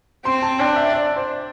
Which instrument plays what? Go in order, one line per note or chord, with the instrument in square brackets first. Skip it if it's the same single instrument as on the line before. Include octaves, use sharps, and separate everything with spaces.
[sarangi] C4 [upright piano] C6
[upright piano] A5
[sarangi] D4 [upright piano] G5
[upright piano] E5
D5
C5